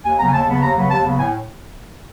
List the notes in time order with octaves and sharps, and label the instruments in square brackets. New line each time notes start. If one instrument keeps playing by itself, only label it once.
[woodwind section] D#2 G#5
C#3 F#3 B3 A#5
G#5
D#2 A5
C#3 F#3 B3
A5
D#2 A#5
C#3 F#3 B3
D#2 A5
C#3 F#3 B3
A2 G#5